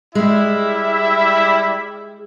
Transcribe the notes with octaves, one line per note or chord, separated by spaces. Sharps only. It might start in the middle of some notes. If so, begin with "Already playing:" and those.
G3 G#3 E4 E5